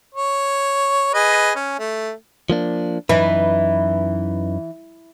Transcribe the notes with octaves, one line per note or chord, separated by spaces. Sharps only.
C#5
G#4 B4 D#5
C#4
A3
F3 A#3 D4
F#2 E3 D#4 B4